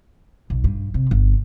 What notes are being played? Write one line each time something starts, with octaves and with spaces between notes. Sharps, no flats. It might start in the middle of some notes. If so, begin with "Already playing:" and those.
B1
G2
C3
G1